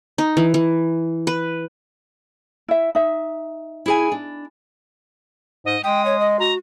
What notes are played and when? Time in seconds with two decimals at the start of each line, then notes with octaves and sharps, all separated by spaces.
0.18 D#4
0.37 E3
0.54 E3
1.27 B4
2.68 E4 E5
2.95 D#4 E5
3.86 E4 G#4 G#5
4.12 D4
5.65 G#2 D#5
5.84 G#3 G5 D#6
6.06 C#5
6.20 D#5
6.39 F#4 A#5